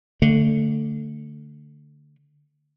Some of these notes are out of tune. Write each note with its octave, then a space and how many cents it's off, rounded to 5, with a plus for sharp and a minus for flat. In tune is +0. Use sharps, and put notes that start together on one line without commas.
D3 +0 A3 +20